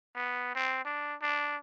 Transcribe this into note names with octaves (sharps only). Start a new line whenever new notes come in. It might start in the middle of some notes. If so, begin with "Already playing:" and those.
B3
C4
D4
D4